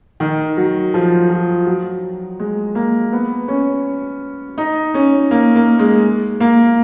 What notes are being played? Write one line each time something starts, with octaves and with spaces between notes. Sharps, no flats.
D#3
F#3
F3
F3
F#3
G#3
A#3
B3
C#4
D#4
C#4
A#3
A#3
G#3
A#3